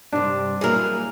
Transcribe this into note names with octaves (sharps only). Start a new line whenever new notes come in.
G2 C3 D4
E3 F#3 A#3 E4 G#4 A#4